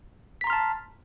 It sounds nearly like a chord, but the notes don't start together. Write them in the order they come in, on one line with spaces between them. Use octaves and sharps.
B6 A#5 C6 F6 A5